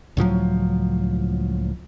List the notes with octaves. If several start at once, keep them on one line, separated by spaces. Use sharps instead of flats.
C#2 A2 F3 F#3